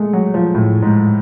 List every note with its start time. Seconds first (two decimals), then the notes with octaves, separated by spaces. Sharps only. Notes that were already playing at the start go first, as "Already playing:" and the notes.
Already playing: G#3 A3
0.13 F#3
0.34 F3
0.55 A2
0.82 G#2